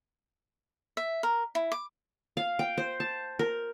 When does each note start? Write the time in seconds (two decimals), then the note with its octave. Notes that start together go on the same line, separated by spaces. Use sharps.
0.97 E5
1.23 A#4
1.55 E4
1.72 D6
2.37 F5
2.59 G5
2.78 C5
3.00 A5
3.39 A#4